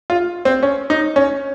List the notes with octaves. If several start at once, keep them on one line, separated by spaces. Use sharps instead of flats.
F4
C4
C#4
D#4
C#4